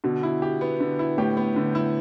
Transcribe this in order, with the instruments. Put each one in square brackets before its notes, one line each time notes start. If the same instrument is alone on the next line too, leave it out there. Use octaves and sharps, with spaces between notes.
[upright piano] B2 [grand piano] D3
[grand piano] E4
G4
B3
D3
E4
[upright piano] A2 [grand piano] G4
[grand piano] B3
D3
E4